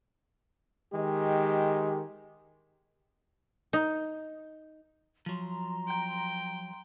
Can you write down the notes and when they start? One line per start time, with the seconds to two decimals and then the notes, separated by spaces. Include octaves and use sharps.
0.93 D#3 G#3 G4
3.73 D#4
5.26 F3 F#3 A#5 C6
5.87 G5